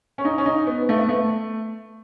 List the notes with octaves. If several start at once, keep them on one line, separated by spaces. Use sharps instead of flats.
C#4
D#4
C#4
D#4
B3
A3
B3
A3